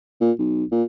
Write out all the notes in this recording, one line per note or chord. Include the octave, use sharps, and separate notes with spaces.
A#2
B1
A#2